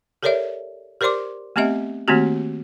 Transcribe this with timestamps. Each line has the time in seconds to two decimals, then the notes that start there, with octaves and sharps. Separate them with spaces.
0.23 G4 A4 A#4 C#5 D5 E5
1.01 G4 A#4 C5 D5 C6 D6
1.56 A3 B3 C4 G4 D#5 E5
2.08 D#3 A3 A#3 C4 F#4 G4